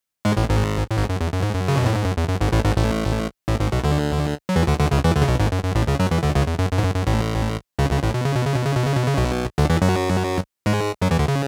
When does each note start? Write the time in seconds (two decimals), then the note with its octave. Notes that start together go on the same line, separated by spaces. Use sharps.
0.25 G#2 G#3
0.37 A1 A2
0.49 G#1 G#2
0.91 A2
0.97 G#1 G#2
1.09 F#2
1.21 E2
1.33 F#2
1.43 G#2
1.54 F#2
1.68 C#3
1.77 B2
1.86 A2
1.95 G#2
2.05 F#2
2.17 E2
2.29 F#2
2.41 G#1 G#2
2.52 A1 A2
2.65 G#1 G#2
2.77 A1 A2
3.48 A1 A2
3.60 G#1 G#2
3.72 B1 B2
3.84 D2 D3
4.49 F#3
4.56 E2 E3
4.67 D2 D3
4.79 D2 D3
4.91 C#2 C#3
5.04 E2 E3
5.16 D2 D3
5.22 C#3
5.28 B1 B2
5.40 G#1 G#2
5.52 F#2
5.64 F#2
5.75 A1 A2
5.87 C#2 C#3
5.99 F#2 F#3
6.11 E2 E3
6.23 D2 D3
6.35 C#2 C#3
6.47 E2
6.59 F#2
6.72 F#2
6.78 G#2
6.84 F#2
6.95 F#2
7.07 A1 A2
7.79 C#2 C#3
7.90 C#2 C#3
8.03 A1 A2
8.14 B2
8.25 C#3
8.35 B2
8.46 C#3
8.55 B2
8.65 C#3
8.76 B2
8.86 C#3
8.96 B2
9.07 C#3
9.17 B1 B2
9.58 D2 D3
9.70 E2 E3
9.82 F#2 F#3
10.66 G#2 G#3
11.02 F#2 F#3
11.11 E2 E3
11.19 D2 D3
11.28 C#3